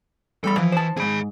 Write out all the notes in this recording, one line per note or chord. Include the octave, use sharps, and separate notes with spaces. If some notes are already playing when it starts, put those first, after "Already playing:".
E2 G3 A4 B5
E3 F3
C5 A5
E2 G#2 G#4 B5